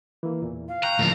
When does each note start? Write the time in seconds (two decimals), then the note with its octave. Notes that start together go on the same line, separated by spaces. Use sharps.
0.23 E3 A#3
0.42 E2 A#2
0.68 F5
0.83 G5 A#5 C#6 F#6
0.99 D2 A2 F3